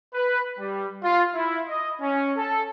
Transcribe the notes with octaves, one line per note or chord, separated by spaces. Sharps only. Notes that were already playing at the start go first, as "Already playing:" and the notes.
B4
G3
F4
E4
D#5
C#4
A4